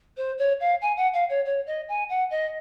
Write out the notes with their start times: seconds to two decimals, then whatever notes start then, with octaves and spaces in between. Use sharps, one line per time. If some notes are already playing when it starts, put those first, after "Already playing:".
0.17 C5
0.38 C#5
0.60 F5
0.81 G#5
0.96 F#5
1.13 F5
1.29 C#5
1.45 C#5
1.66 D#5
1.88 G#5
2.09 F#5
2.30 D#5